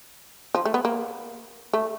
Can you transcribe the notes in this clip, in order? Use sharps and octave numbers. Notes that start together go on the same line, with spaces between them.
F3
A3
B3
A#3
A3